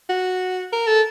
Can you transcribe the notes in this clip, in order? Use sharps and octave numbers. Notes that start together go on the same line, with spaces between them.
F#4
A#4
A4